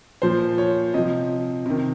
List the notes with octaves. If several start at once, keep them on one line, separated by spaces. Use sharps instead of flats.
A#2 F3 C5
C#5
C3 F3 D#5
C3 D#3